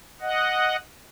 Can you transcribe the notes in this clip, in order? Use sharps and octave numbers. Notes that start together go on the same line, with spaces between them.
D#5 F#5